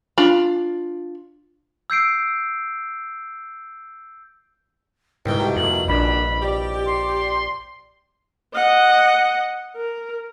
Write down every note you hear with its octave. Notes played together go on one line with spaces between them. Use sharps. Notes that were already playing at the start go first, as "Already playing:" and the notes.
D4 F4 B5
E6 G6 C7 D7
C2 G#2 B2 G5
F#3 A3 G4
F2 F#3 A3 A#3 F#7
A#1 F#2 A#2 D4 B5
G4 D5
C6
D#5 F#5
A#4